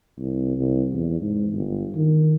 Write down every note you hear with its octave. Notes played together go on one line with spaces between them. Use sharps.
C2
C2
E2
G#2
G1
D#3